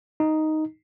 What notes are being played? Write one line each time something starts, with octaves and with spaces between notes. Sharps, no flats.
D#4